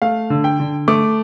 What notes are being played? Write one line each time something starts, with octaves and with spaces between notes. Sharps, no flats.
A3 F5
D3
G5
D3
A3 D6